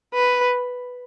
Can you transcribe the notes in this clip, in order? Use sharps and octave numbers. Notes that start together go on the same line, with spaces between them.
B4